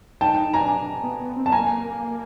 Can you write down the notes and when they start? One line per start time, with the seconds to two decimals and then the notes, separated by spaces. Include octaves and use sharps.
0.21 D#4 G5 A5
0.54 D4 G#5 A#5
1.03 B3
1.20 B3
1.36 C4
1.46 A5
1.52 A#3 G#5 A#5